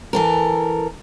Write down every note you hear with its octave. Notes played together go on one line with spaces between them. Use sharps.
E3 A4 A#4